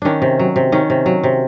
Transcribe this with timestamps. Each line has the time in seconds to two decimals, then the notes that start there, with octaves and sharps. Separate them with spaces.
0.02 D#3 C#4 D4
0.22 C3
0.39 F#3
0.56 C3
0.72 D#3 C#4
0.90 C3
1.06 F#3
1.24 C3